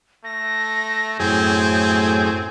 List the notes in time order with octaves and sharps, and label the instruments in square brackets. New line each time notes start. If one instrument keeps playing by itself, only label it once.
[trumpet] A3 [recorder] A#6
[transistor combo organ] F#2 G#4 G#5 [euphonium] A2 [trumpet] C4 [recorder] G6